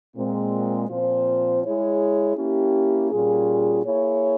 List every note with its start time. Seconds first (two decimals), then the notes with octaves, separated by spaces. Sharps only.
0.16 A#2 G#3 C4
0.89 A#2 F3 C4 F4 C5
1.63 G#3 E4 G#4 C#5
2.36 A#3 C#4 E4 G4
3.10 A#2 G3 C#4 F4 G#4
3.84 A#3 E4 G#4 C#5